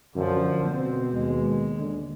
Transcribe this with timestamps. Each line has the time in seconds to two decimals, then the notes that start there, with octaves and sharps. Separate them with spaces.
0.15 F#2 D3 F3
0.69 B2 C4
1.13 D#2 G#3
1.78 D3